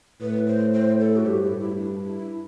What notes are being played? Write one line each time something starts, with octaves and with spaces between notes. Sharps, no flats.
A2 B4
C5
C5
A4
F#4
G2 G4
E4
E4
D4
E4